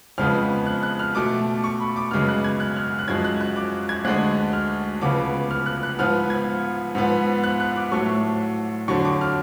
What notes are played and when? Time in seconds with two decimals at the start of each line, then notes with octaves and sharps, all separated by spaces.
0.18 F2 C#3 F3 G#3 B3 F6
0.66 F#6
0.83 F#6
0.99 F6
1.15 B2 A3 D6
1.64 C#6
1.80 B5
1.96 D6
2.11 F#2 C#3 G#3 B3 F6
2.28 F#6
2.44 G#6
2.60 F#6
2.76 F6
2.87 F6
2.99 F#6
3.08 F#2 F3 G#3 G#6
3.24 F#6
3.41 F#6
3.56 D6
3.89 G#6
4.05 D2 D3 G#3 F#6
4.53 F6
5.01 C#2 C#3 F3 B3 D6
5.51 F6
5.66 F#6
5.83 F#6
5.99 G#2 F3 B3 F6
6.30 G#6
6.95 G#2 F3 B3
7.44 F#6
7.60 F#6
7.76 D6
7.92 A2 F#3 A3 C#6
8.88 F2 D3 F#3 C#6
9.05 D6
9.21 F6